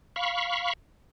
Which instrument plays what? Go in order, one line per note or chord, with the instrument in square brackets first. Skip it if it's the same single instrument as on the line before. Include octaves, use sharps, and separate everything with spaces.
[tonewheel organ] F5 B5 C#6